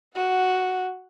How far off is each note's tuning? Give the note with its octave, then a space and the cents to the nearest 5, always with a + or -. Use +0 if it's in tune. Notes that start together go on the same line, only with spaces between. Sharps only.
F#4 +0 F#5 -5